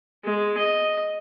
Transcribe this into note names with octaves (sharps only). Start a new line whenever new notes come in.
G#3
D#5